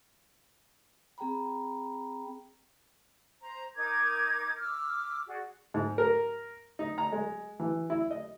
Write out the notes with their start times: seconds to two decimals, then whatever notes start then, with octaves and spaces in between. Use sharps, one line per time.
1.18 C4 G#4 G5 A#5 B5
3.40 C5 A#5
3.76 D#4 A#4 D6 G#6
4.58 D6 E6 F6
5.27 F#4 G#4 D5
5.74 G#2
5.98 A#4
6.79 D#4
6.98 A#5
7.12 G#3
7.60 E3
7.90 E4
8.11 D#5